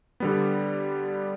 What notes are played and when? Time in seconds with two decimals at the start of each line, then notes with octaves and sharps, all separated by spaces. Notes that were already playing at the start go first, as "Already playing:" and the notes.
0.20 D3 G3 B3